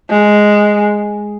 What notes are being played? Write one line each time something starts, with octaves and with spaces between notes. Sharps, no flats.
G#3